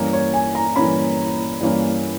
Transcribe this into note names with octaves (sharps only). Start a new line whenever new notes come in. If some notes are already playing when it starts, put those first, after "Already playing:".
Already playing: G2 E3 A#3 C#4
C#5
G#5
A#5
G2 E3 A#3 C#4 B5
G2 E3 A#3 C#4